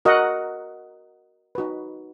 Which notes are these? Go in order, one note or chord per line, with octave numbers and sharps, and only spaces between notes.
F#4 A#4 D#5 F#5
D#4 F#4 B4